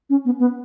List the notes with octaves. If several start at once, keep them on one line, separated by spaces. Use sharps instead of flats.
C#4
B3
B3